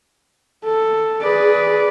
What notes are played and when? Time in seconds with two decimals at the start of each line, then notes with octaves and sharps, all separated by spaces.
0.64 A4
1.21 G#4 B4 D5